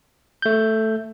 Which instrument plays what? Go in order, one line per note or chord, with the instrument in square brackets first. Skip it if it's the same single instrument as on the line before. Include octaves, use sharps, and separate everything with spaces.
[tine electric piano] A3 G6